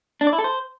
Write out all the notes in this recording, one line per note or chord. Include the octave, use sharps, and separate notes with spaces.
D4
D5
E4
A4
C5